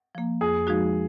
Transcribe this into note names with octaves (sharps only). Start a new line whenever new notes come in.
F3 A#3
F2 G#4
F3 G#3 D#4 F#4